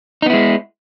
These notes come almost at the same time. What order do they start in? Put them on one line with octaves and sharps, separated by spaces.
D#4 B3 E4 G#3